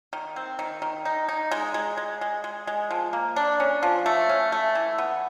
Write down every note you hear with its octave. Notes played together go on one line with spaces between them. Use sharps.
D#3
C4
D#3
D#3
D#4
D#4
G#3
G#3
G#3
G#3
G#3
G#3
F3
A#3
D4
C#4
F3
A3
C#4
A3
E3
B3